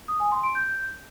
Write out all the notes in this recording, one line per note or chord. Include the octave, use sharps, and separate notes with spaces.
D#6
G#5
C6
D7
G6